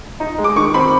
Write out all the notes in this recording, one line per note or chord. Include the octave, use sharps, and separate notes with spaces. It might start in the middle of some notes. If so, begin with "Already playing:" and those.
D#4
G#3
D6
D#3 C#6
C4 B5